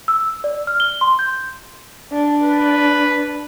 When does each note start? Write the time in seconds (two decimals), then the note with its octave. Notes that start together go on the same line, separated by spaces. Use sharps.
0.08 E6
0.44 D5
0.67 F6
0.80 G7
1.01 C6
1.19 G6
2.12 D4
2.44 B4